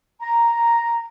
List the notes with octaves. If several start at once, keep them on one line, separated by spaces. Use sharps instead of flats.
A#5